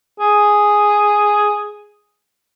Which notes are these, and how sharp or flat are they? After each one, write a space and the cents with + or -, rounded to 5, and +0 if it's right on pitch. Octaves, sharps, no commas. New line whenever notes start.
G#4 +0